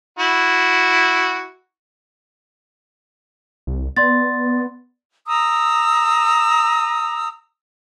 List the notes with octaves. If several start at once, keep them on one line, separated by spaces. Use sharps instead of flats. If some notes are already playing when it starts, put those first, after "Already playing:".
E4 F#4
C2
B3 D5 C6 A6
A#5 D#6 E6